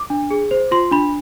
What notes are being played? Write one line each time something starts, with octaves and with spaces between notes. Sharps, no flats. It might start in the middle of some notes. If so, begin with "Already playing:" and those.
Already playing: D6
D4
G#4
C5
F4 C6
D4 B5